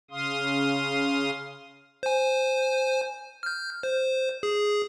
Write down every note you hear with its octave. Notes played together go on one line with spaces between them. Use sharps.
C#3 F5 C6 D#6
C5 G#5
F6 G6
C5
G#4